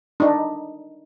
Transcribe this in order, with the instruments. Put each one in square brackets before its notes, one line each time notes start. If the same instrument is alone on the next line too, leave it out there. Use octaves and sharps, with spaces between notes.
[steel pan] D4 D#4